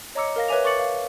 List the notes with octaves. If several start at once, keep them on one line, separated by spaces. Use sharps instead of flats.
C#5 D#5 A#5 D6 E6 C#7
A#4 F5 A#6
B4 C#5 E5 G#5 D6 F7
A#4 C#6 D6 A6 C#7 F#7
F5